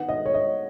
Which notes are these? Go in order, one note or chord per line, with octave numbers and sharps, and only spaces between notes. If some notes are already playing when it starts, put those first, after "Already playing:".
Already playing: D#3 B3 F#5
D#5
C#5
D#5